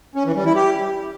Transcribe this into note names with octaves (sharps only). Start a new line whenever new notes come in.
C#4
E3
G3
E4
G4